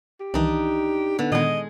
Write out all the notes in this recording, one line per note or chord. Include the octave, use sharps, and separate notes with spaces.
G4
C2 D#3 E3 D4 D#4
D3 B3
A#2 D#3 G#3 B3 G#4 D#5